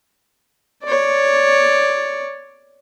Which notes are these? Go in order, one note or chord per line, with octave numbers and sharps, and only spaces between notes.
C#5 D5